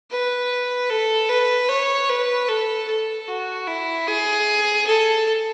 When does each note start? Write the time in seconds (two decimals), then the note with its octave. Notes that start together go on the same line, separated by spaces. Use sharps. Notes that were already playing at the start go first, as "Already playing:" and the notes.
0.11 B4
0.90 A4
1.29 B4
1.69 C#5
2.09 B4
2.48 A4
2.88 A4
3.28 F#4
3.67 E4
4.07 G#4
4.87 A4